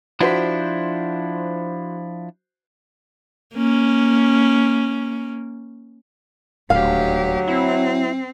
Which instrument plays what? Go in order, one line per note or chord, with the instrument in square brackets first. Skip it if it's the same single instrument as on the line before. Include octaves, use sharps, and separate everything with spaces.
[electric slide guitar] F3 D4 E4 [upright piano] F#4 C5 B6
[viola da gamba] A#3 C#4
[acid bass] D#1 [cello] D2 G4 [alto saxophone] F#3 [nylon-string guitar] F5
[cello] C4 [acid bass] E4